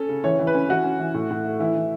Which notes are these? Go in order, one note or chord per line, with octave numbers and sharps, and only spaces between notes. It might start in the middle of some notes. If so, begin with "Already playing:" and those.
Already playing: C#4 A4
C#3
E3 C#5
E3
B4
C#4
E3 F#4
C#4
E3
A2
A2
A3
E3 E4
E3